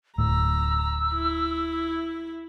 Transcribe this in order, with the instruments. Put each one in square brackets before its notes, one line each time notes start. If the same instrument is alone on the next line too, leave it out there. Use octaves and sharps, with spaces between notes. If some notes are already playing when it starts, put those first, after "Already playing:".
[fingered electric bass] D1 A2 [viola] A#5 [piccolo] E6
[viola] E4